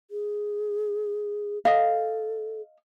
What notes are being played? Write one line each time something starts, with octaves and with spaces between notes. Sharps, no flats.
G#4
A4 D#5 F5